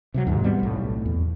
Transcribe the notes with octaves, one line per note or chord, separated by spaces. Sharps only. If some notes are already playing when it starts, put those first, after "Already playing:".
C3 E3 F#3
D#2 G#2 C3
A2 G3 B3 C4
B1 A2
E2